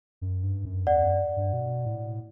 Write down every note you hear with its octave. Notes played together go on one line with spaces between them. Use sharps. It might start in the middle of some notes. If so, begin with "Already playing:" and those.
F#2
G2
F#2
E2 D5 F#5
F#2
G2
B2
A2